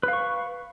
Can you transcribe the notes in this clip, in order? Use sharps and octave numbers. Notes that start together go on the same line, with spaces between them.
B4 F5 C#6